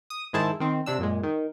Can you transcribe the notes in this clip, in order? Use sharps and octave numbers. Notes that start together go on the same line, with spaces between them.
D#6
G#2 D#3 E4 G#4 C5 A5
D#3 C4
C3 D4 E6
F#2 A#2 G#3
D#3